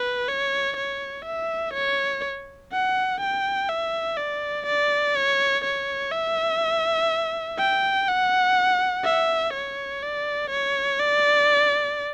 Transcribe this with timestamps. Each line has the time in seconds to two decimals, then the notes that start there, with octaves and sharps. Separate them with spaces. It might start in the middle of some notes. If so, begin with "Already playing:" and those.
Already playing: B4
0.28 C#5
0.77 C#5
1.25 E5
1.74 C#5
2.72 F#5
3.20 G5
3.69 E5
4.17 D5
4.66 D5
5.16 C#5
5.64 C#5
6.12 E5
7.59 G5
8.08 F#5
9.04 E5
9.53 C#5
10.03 D5
10.50 C#5
10.99 D5